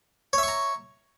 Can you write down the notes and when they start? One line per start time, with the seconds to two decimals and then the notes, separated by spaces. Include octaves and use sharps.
0.33 C#5
0.38 E5
0.43 C#6
0.48 A#5